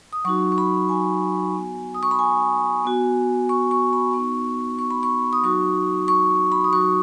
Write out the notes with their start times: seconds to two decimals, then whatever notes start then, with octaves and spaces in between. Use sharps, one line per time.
0.13 D#6
0.25 F#3 D#4 F#4 C#6
0.52 C#6
0.58 B5
0.89 G#5
1.54 B3 F#4
1.95 D#6
2.03 C#6
2.11 B5
2.19 G#5
2.85 B3 F#4
3.49 C#6
3.71 C#6
3.93 B5
4.13 B3 D#4 F#4 C#6
4.79 C#6
4.91 B5
5.03 C#6
5.33 D#6
5.43 F#3 D#4 F#4 C#6
6.08 C#6
6.52 B5
6.64 D#6
6.73 F#3 D#4 F#4 C#6